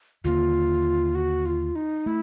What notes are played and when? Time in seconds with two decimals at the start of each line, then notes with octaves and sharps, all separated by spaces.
0.24 D#2 D3 F#3 A#3 F4
1.15 F#4
1.46 F4
1.76 D#4
2.06 A3 E4